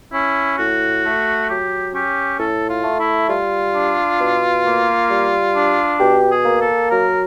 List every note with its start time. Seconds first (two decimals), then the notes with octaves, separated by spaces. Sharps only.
0.13 C#4 E4
0.58 A2 F#4
1.04 A3
1.48 F#3 G4
1.94 C#4 G4
2.39 A2 A4
2.69 F4
2.84 A3
2.99 E4
3.29 G3 F4
3.74 D4
4.20 B2
4.65 A#3
5.10 G3
5.55 D4
6.00 B2 G4
6.30 G#4
6.45 A#3
6.60 A4
6.91 F#3 A#4